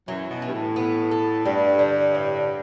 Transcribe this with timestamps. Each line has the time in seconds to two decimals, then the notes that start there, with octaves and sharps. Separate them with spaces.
0.08 F#2 E3 F#3
0.31 B2
0.42 G2 E3
0.54 A2
0.76 B3
1.11 A4
1.45 G2 G3
1.79 D3
2.14 A2